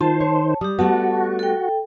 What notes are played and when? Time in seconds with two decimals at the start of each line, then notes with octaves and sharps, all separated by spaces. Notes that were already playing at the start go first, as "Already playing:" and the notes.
0.01 D#3 F4 C5 A5
0.21 C#5
0.61 G3 G4 D#6
0.79 G3 A3 B3 F#4 F#5 A5
1.39 A4 G5